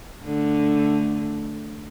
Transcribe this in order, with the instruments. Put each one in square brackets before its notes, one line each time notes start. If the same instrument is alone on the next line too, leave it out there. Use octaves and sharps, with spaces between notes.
[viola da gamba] D3 A3